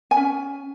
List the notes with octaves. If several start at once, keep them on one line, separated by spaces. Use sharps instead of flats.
G#5
C#4